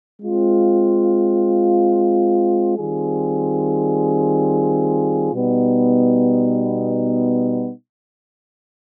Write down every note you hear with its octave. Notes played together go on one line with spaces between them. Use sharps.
G#3 C4 F4
D#3 G3 C4 F4 G#4
B2 G3 B3 D#4